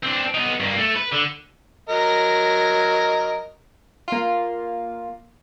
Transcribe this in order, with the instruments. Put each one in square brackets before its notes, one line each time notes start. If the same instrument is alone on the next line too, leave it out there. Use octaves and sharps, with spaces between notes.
[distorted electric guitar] C4 D4
B3 D#4
G2 A#3
A3
B4
D3
[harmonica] F#3 A#4 D#5
[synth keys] A#3 F4